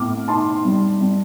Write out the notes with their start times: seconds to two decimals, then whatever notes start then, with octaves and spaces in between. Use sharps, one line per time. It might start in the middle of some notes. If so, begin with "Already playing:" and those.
Already playing: A2 C4 D6 F6
0.28 D#4 A5 C6
0.65 G3
1.01 G3